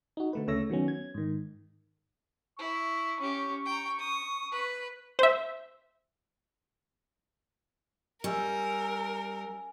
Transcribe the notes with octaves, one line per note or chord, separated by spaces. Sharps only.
D#4 F#4
D3 A3 B4
D2 C#3 A3 C#5 E6 A#6
D#3 F#3 B3 C#4
G#6
G#2 D#3
E4 C#6
C#4 G4
G5 A#5
D#6
B4
C5 E5
G3 C#4 A#4 E5